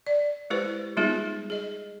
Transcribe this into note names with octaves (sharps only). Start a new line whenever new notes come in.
D5
G#3 E4 G4 B4 C5
G3 G#3 B3 D#4 F4 G#4
G#4 D#5